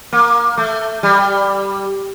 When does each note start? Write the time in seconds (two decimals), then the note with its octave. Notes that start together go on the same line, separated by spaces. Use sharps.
0.13 A#3
0.58 A3
1.03 G3